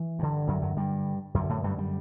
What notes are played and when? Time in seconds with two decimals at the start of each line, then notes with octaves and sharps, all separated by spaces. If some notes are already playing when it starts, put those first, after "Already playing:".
Already playing: E3
0.19 G2 D3
0.48 F#2 F#3
0.62 F#2 F#3
0.77 G2 G3
1.34 F#2 D3
1.49 A2 A3
1.64 G2 G3
1.78 G3